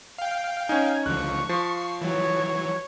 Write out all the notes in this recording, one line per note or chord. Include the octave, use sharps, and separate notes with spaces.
F5 G5
C#4 D#4 G#5
C#2 D3 F3 C#6 F#6
F3 C7
E3 F#3 C#5